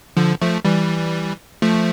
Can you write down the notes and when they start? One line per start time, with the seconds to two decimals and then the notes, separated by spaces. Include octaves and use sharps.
0.17 D3 F3
0.41 F3 A3
0.65 E3 G3
1.62 F3 A3